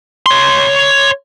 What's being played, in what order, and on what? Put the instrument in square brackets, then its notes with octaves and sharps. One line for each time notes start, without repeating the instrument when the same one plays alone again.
[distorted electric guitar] C#5 C6